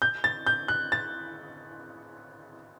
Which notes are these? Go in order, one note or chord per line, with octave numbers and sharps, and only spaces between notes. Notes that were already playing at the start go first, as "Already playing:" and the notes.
G6
A6
G6
F#6
A6